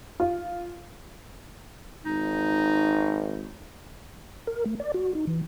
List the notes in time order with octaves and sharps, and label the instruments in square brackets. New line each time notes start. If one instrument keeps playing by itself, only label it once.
[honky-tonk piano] F4
[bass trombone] G#1 [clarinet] D#4
[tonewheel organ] A#4
A3
D5
F#4
D#4
E3